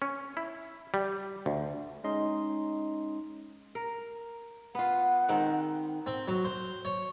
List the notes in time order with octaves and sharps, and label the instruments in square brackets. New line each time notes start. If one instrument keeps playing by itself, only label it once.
[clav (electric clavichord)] C#4
E4
G3
D2
[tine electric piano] G#3 C#4 D#4 D#5 C6
[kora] A#4
[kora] B3 F4 [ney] F#5
[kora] D#3 G#3 C4
[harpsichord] C4
F#3
C5
C#5